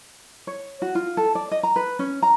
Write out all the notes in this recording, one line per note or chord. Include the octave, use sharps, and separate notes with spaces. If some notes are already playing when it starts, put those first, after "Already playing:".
C#5
F#4
F4
A4
D5
D#5
A#5
B4
C#4
A#5